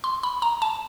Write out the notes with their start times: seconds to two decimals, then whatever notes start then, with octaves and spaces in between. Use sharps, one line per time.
0.04 C6
0.23 B5
0.42 A#5
0.62 A5